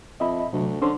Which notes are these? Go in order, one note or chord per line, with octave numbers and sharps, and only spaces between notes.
F2 D#5 E5 B5
D2 C3 F#3
D3 C#4 C5 C6